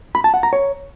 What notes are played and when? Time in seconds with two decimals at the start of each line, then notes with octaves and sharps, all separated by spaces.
0.15 B5
0.24 A5
0.34 F#5
0.43 A#5
0.53 C#5